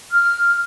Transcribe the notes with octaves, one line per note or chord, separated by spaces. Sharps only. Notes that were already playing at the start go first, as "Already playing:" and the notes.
F6